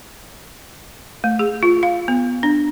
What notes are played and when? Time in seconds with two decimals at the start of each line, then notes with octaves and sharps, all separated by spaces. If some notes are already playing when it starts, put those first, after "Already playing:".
1.24 A3
1.39 G#4
1.63 F4
1.83 F5
2.08 B3
2.43 D4